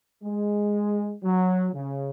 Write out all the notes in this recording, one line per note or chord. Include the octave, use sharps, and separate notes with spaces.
G#3
F#3
C#3